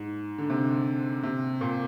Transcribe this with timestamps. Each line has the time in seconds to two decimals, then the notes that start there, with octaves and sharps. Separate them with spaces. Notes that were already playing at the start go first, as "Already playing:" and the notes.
Already playing: G#2
0.38 D3
0.50 C3
1.23 C3
1.61 A#2